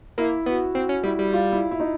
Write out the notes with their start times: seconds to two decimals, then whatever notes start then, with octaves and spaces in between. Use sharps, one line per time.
0.18 A#3 E4
0.46 B3 F#4
0.75 C4 F#4
0.89 C#4
1.03 G3 E4
1.19 G3
1.33 F4
1.52 E4
1.71 E4
1.80 D#4